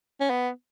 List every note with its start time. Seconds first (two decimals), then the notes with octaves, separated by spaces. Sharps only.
0.20 C#4
0.30 B3